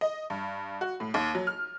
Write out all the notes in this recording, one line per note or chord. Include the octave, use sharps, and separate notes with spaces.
D#5
G2
F#4
A2
D#2
F#3
F6